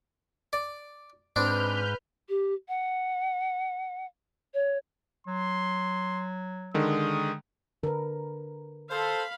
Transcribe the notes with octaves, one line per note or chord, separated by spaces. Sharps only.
D5
G#2 C4 D4 B4 F6 G6
G4
F#5
C#5
F#3 C6
D3 D#3 G#3 D#6
D3 A#4 B4
A4 C5 F5 B5